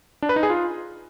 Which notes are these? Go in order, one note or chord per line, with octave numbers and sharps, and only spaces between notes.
D4
B4
D#4
G#4
F4